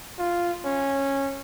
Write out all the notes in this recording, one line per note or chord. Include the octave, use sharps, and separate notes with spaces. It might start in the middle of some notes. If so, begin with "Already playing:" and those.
F4
C#4